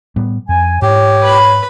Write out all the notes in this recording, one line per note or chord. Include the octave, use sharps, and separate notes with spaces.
A2 G3 B3
F2 G#5
G#2 G4 C#5
B4 B5